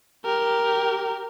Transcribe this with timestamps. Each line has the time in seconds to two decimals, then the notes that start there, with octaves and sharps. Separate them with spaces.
0.25 G4 A#4